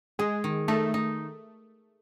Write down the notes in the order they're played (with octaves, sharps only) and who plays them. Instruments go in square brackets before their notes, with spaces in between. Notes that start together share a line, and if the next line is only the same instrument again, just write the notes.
[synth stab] G#3 [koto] G#4
[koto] D#3
[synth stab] A3 [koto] D#4
[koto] D#4